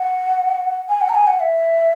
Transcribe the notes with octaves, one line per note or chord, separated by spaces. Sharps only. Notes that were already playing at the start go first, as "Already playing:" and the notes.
Already playing: F#5
G#5
F#5
A#5
G#5
F#5
E5